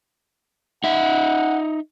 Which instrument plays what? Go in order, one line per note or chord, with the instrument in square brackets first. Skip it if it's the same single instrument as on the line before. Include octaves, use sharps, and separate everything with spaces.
[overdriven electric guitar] D#4 E5 [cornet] F#5